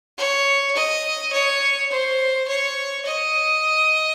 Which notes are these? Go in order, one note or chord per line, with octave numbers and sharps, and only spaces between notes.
C#5
D#5
C#5
C5
C#5
D#5